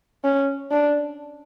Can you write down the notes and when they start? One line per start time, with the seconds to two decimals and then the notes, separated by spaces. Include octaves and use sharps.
0.24 C#4
0.71 D4